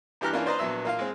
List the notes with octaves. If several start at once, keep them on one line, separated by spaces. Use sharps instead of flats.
G2 E3 G4 A#5 F6 F#6
E3 A#3 C#4 D4 F4
B4 C5 D5 D#5 A#5 C6
A#1 F#3 B3 E5 E6
A#3 F4 F5
G#3 C4